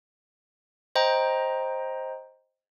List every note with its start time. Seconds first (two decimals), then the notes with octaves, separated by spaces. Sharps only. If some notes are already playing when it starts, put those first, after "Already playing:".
0.95 C5 D#5 G5 A#5